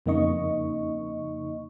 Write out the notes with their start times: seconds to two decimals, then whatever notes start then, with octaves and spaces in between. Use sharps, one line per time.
0.06 F2 C#3 A#3 D#4 D#5 C#6